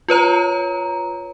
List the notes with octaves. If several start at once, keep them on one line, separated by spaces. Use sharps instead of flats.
F4 B4 C#5 A#5